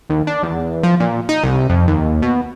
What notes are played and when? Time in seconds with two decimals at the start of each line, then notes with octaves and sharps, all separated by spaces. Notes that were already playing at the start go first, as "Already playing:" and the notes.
0.10 D#2
0.27 D4
0.43 E2
0.83 F3
1.00 A#2
1.29 D#4
1.43 C2
1.70 F2
1.88 D#2
2.22 B2